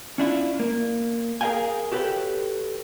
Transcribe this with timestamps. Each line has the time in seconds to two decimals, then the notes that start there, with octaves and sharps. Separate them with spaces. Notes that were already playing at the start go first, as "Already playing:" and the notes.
0.18 C#4 D4 E4 F4
0.60 A#3
1.41 G#4 A#4 D#5 F5 G5 G#5
1.92 F#4 G4 A4 B4 C#5 G5